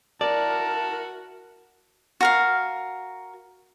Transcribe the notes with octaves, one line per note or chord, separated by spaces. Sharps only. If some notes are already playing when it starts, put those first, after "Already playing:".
E4 F#4 A#4 D5 A5
F#4 A#4 F5